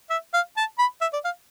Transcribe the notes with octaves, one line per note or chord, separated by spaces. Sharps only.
E5
F5
A5
B5
E5
D5
F5